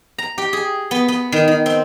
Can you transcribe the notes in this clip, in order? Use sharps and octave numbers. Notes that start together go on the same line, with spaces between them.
A#5
G4
G#4
B3
B3
D#3
D#3
C4